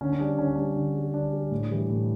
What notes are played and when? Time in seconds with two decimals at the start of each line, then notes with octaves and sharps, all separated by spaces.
0.01 D3 C#4
0.12 C#4
0.19 G3 D4
0.38 D3 C#4
0.47 D4
0.56 G3 C#4
0.76 D3
0.95 G3
1.14 D3 D4
1.32 G3
1.51 A2
1.70 E3 G3
1.89 A2